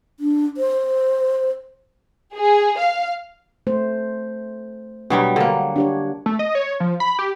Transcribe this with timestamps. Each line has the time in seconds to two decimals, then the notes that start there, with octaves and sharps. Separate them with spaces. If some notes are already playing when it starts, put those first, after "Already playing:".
0.20 D4
0.57 C5
2.34 G#4
2.79 F5
3.67 A3 C5
5.10 B2 F#3 G3 D4
5.36 D3 A#3 F#5
5.76 D4 G4 C#5
6.26 A3
6.39 D#5
6.55 C#5
6.80 F3
7.00 B5
7.19 G4